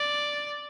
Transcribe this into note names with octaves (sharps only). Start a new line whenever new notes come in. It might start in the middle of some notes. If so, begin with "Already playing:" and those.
Already playing: D5